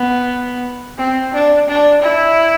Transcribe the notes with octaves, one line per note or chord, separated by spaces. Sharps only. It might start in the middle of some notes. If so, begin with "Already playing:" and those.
Already playing: B3
C4
D4
D4
E4